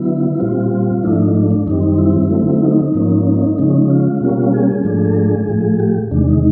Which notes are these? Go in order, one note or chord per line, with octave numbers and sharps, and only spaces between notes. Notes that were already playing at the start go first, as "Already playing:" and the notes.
Already playing: D3 F#3 B3 E4
A#2 G3 C4 F4
G#2 F3 A3 D4 E4
D#4
D4
D4
F#2 D#3 G3 C4 D#4
D#4
E4
D3 F#3 A3 C4
D#4
G#2 F3 A#3 C#4
D#4
C#3 F3 G#3 C#4
F4
B2 G3 A#3 C#4
G#4
G#2 F3 A3 D4
A4
G#4
A2 F3 A3
G4
E2 C3 D#3 G#3 D4
D#4